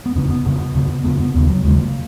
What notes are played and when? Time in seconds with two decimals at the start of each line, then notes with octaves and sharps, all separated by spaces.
0.06 B3
0.15 F2 C#3 C#4
0.30 B3
0.45 F2 C#3
0.74 F2 C#3
1.05 F2 C#3 B3
1.20 B3
1.34 D#2 C#3 B3
1.49 F#3
1.64 D#2 C#3 G#3
1.79 A#3